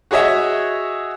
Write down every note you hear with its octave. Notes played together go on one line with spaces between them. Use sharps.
F#4 G#4 C#5 D#5 E5